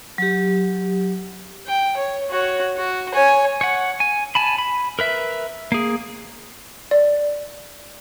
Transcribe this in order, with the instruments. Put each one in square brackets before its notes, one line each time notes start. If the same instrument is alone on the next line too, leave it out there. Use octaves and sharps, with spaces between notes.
[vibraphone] F#3 G4
[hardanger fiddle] G5
C#5
F#4 C#5
F#4
C#5 G#5
[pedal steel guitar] C#5 F#5
G#5
G#5 A5 B5
B5
A#4 B4 E5
A#3 G#4
[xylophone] D5